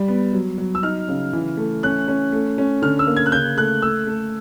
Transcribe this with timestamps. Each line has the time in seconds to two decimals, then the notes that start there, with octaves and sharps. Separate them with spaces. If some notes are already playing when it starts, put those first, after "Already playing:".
Already playing: G3
0.08 B3
0.33 F#3
0.58 F#3
0.75 E6
0.82 D#4 F6
1.08 C#3
1.33 E3
1.57 A3
1.83 C#4 F#6
2.08 C#4
2.32 A3
2.58 C#4
2.82 D3 F6
2.99 E6
3.07 A#3
3.17 G#6
3.26 F#6
3.32 C#3 G6
3.57 A3 F#6
3.82 A3 E6
4.07 A3